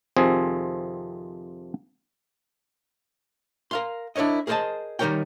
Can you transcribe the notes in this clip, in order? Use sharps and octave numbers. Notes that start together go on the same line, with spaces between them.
F2 C3 D#3 F3 C4 G#4
A#4 F5 C6
D4 E4 A#4 C#5 D#5
G#4 A#4 C5 C#5 D#5 A5
D#3 G3 D#4 A#4 C#5 G5